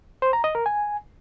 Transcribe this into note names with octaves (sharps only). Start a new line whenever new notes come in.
C5
A#5
D#5
A#4
G#5